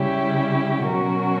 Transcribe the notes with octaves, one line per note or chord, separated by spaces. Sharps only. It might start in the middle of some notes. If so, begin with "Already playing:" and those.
Already playing: C#3 G3 C#4 E4 G4
B2 F#3 C#4 F#4 A#4